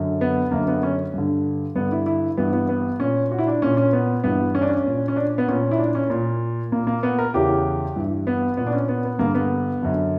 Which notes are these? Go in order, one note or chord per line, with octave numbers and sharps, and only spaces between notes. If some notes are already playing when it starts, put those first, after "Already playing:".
Already playing: F#2 D3
B3
F#2 D3 A#3
B3
C#4
G2 D3
G2 D3 B3
E4
E4
G2 E3 B3
B3
B3
A#2 C#4
F#4
E4
D4
A#2 C#4
C#4
B3
G2 E3 B3
C#4
D4
C#4
A#2
C#4
D4
B3
A#2 C#4
E4
D4
C#4
A#2
A#2 A#3
A#3
B3
A#4
E2 C#3 E3 G4
G2 E3
B3
A#2 B3
D4
C#4
B3
B3
G2 D3 A#3
B3
F#2 D3